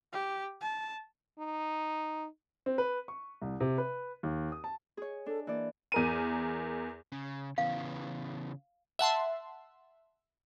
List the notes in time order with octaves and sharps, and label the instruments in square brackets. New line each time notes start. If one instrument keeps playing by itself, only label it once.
[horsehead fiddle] G4
A5
[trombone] D#4
[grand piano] C4
B4
C#6
C2
C3
B4
D#2
D#6
A5
[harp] G#4 C#5
[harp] D4 [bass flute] A4
[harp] E3 D5 [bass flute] A#3
[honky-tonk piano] E2 A#4 D#7
[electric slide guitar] C#3
[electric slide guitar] C#3 E3 B3 [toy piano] F5
[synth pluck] E5 F#5 A5 C6